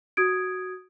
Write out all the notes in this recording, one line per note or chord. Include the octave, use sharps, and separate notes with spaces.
F#4 D#6 G#6 D7